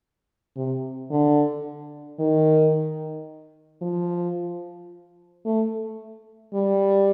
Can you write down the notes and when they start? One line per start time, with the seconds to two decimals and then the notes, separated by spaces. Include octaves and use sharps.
0.56 C3
1.10 D3
2.19 D#3
3.82 F3
5.45 A3
6.54 G3